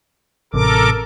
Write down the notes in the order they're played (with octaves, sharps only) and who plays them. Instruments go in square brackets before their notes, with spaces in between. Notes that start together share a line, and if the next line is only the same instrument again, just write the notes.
[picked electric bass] A1 C3 [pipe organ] A4 A#4 D6